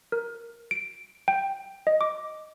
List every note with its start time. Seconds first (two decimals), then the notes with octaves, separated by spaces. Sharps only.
0.12 A#4
0.71 D7
1.28 G5
1.87 D#5
2.01 D6